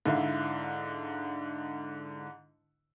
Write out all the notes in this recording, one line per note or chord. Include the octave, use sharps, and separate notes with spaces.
G#2 D3 E4 F5